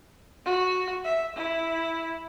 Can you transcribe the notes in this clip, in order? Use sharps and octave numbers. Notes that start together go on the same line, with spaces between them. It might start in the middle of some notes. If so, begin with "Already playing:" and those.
F#4
E5
E4